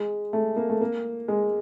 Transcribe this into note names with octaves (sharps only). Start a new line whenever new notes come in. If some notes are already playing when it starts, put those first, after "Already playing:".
Already playing: G#3
A3
A#3
A3
A#3
G#3